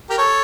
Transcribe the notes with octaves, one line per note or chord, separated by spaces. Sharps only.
G4 A#4
A4 C#5